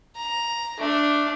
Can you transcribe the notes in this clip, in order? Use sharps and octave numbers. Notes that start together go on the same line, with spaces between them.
A#5
A3 D4